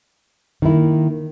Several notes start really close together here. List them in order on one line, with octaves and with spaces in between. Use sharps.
D#3 E4 A#3